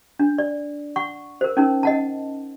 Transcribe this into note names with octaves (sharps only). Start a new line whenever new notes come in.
D4
D5
F#5 C#6
A#4 C5
C#4 D#4 A#4
D#5 F#5 A5